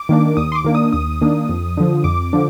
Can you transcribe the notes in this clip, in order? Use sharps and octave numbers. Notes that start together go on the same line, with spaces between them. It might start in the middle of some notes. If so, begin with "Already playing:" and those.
Already playing: D6
D#3 A#3 D4
D#2 D#6
C6
D6
D#3 A#3 D4
D#6
D#2 D#6
D#3 A#3 D4
F2
D3 F3
F2 D6
D3 F3